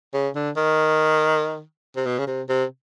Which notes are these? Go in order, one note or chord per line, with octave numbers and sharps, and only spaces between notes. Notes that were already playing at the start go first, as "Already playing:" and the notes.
C#3
D3
D#3
C3
B2
C#3
C3
C3